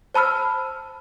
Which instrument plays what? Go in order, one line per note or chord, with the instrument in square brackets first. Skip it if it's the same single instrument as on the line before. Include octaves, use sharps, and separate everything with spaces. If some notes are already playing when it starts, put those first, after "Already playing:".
[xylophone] C5 A5 B5 E6 F6